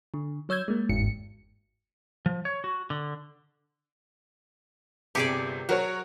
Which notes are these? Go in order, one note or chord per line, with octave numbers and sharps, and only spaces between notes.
D3
F#3 C#5 E6 G6 G#6
G#3 A#3
G1 E2 G#2 C#7
F3
C#5
F#4
D3
G1 C3 G4 G#4 D5 C#7
F#3 F#4 A#4 C#5